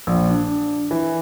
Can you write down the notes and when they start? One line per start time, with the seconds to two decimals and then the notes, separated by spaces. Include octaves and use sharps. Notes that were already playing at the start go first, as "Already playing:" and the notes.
0.07 A#1
0.29 D4
0.91 E3